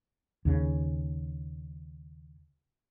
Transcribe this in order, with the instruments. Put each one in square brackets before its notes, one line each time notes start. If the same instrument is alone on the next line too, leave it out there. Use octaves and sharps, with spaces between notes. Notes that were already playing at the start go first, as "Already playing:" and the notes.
[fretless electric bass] D#2 C#3